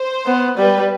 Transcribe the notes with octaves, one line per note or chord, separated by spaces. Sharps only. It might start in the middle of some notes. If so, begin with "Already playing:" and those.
Already playing: C5
B3
G3 B4